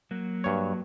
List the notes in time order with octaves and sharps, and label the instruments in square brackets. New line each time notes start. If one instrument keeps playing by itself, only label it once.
[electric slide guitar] F#3 A#3 F#4
[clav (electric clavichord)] G2 C#5